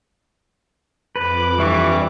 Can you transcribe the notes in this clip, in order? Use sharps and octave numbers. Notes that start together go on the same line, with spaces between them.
F2 B4 D6
G2 E3 G3 C#6